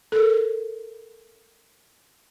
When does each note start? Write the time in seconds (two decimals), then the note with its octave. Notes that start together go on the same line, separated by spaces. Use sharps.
0.12 A4 A#4